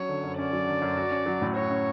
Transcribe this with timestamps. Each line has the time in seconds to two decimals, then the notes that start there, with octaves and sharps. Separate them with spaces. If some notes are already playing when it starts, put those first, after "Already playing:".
Already playing: F#3 C#4 C#5
0.09 D3
0.24 F#2
0.38 C#4 D5
0.53 F#3
0.67 D3
0.82 F#2
0.97 F#4
1.11 C#4
1.26 F#3
1.42 A2
1.56 F#4 C#5
1.70 C#4